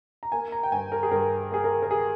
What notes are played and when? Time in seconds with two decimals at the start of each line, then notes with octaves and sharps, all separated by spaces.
0.23 A#5
0.32 A#3 G#5
0.52 A#5
0.63 G5
0.72 G2 G#5
0.92 A#4
1.03 G#4
1.11 G2 A#4
1.51 A#3 G#4
1.64 A#4
1.82 A#4
1.91 G#4